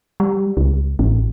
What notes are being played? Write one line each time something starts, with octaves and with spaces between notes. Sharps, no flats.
G3
C#2
A1